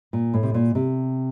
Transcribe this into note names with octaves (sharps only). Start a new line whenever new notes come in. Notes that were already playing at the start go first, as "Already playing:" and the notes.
A#2
A2
C3
A#2
C3